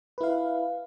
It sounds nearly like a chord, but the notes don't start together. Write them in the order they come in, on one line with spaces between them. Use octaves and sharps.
B4 E4 F5